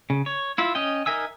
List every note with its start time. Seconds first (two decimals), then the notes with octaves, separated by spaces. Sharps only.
0.10 C#3
0.26 C#5
0.58 E4 F4 E5
0.75 C#4 D#5 G5
1.06 D#4 A#4 E5 G#5 E6